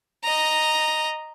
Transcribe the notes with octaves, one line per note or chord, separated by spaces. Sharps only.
D#5 A#5